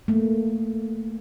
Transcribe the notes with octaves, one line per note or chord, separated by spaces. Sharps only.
A3 A#3